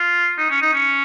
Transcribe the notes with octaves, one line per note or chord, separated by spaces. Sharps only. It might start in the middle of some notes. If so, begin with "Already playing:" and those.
Already playing: F4
D#4
C#4
D#4
C#4